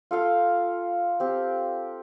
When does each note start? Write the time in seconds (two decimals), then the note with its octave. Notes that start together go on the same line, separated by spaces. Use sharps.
0.11 F4 A4 F5 G5
1.20 C4 G4